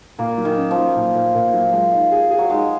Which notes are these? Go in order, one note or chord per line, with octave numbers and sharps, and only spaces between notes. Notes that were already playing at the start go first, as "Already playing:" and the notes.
A#2 A#3
F#3
D#3
C#4
F3
F#3
A#2
A#2
A#2
F#3
F3 G#3
D#4
G#4
G#4
F#3
G#3 D#4